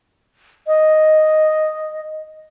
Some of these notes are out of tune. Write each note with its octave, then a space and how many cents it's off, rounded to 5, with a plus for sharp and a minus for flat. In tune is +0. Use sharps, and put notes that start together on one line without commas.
D#5 +0